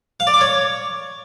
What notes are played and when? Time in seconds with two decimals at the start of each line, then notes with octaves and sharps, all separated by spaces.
0.20 F5
0.27 D5
0.34 D6
0.41 C#5